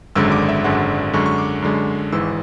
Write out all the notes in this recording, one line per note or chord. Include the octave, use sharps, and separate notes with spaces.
G#1 F#2 D3 G#3 E6
D6
E5
G#1 F#2 D3 G#3 F#5
F#2 D3 G#3 C#6
C#6
D6
F#2 D3 G#3
G#1 G#2 E3 E6